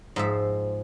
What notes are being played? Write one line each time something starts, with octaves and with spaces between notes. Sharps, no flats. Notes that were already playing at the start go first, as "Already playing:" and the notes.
G#2 F3 E5